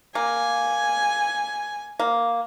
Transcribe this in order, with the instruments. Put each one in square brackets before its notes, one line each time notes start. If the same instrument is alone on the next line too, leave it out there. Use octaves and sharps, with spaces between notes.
[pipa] A#3 [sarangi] G#5
[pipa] A#3